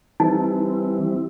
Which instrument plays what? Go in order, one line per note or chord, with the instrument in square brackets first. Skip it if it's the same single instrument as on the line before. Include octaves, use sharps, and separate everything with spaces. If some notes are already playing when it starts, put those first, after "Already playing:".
[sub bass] E3 [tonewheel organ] G3 C4 E4 [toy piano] D#4